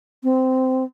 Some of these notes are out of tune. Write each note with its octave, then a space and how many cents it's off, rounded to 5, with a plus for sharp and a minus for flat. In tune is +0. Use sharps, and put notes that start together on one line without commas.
C4 -15